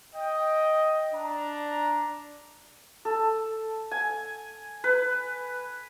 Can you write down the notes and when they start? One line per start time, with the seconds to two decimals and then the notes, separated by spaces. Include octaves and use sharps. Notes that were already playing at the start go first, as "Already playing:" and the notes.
0.15 D#5 G5
1.14 D4 A#5
3.05 A4
3.91 G#5
4.84 B4